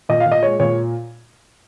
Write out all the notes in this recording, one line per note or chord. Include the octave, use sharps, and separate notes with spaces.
A#2 D#5
F5
A#2
D#5
G#3 C#5
A#2 C#5